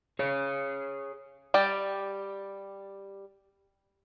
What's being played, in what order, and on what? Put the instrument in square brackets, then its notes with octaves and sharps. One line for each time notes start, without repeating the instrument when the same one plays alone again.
[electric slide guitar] G#4 C#5
[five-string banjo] G3 G4 D5